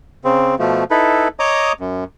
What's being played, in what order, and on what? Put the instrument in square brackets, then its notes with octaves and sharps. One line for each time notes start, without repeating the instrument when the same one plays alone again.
[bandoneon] C#3 C4
B2 F3 A3
D#4 E4 A4 B4
C#5 D#5 A#5 D6 D#6
F#2